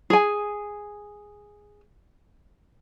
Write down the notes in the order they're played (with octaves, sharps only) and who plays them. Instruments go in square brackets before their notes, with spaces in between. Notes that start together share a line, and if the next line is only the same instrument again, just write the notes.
[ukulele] G#4 G#5